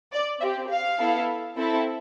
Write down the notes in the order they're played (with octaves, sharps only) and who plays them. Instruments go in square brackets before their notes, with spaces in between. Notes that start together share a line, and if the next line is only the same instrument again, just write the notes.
[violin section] D5
C4 E5
G4
F5
B3 E4 A4
C4 E4 A4